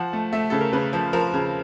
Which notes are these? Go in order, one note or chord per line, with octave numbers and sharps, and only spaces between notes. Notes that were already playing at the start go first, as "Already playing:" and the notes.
Already playing: F3 F#5
A3
A3 E5
C#3 A4
A#4
C#3 B4
F3
F3 A#4
C#3